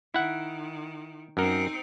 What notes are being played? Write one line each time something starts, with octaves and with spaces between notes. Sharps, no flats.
D#3 E4 F#5
F#2 C4 D#4 A#4